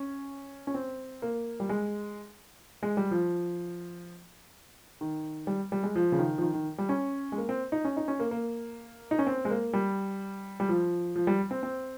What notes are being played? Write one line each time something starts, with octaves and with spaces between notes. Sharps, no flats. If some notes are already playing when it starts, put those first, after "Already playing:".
Already playing: C#4
C#4
C4
A#3
G3
G#3
G#3
G3
F3
D#3
G3
G3
G#3
F3
C#3
D#3
F3
D#3
D#3
G3
C#4
G#3
A#3
C4
D#4
C#4
D#4
C#4
A#3
A#3
D#4
C#4
C4
G#3
A#3
G3
G3
F3
F3
G3
C4
C4